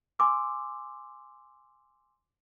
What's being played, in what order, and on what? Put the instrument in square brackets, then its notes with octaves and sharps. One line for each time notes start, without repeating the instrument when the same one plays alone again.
[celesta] G#5 C6 D6 E6